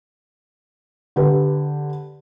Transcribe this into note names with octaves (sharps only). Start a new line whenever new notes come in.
D3 G4 B4